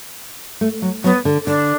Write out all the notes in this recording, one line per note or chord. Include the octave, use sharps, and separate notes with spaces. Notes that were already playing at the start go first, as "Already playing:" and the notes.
A3
F#3
F#3 B3
D3
D3 D4